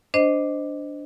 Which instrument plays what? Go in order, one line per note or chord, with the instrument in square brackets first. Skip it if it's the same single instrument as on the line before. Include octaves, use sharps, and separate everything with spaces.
[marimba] D4 C5 D#5